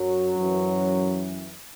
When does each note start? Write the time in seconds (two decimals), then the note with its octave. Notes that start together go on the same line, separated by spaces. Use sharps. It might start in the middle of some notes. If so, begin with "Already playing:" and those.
Already playing: F#2 F#3
0.38 F#2 E3